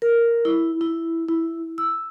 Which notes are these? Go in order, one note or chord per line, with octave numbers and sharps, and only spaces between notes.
A#4
E4
E4
E4
E6